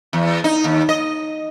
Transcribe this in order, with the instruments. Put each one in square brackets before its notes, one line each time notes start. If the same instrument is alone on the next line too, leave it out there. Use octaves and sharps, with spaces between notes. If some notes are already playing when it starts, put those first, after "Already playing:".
[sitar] E2
D#4
D#2
D#5